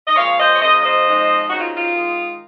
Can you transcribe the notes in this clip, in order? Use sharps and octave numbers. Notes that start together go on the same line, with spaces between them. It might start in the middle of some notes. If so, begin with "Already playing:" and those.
D#5
A#2 F3 G#3 C#5 F5
C5 D#5
C#5
C#3 F3 A#3 C5 D#5
C5 D#5
F3 G#3 C4 D#4
C#3 F#3 C4 D#4 F#4
F4
F4
D#3 G#3 D#4